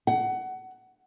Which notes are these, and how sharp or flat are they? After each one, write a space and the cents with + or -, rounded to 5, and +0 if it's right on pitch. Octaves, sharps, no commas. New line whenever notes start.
F#5 +20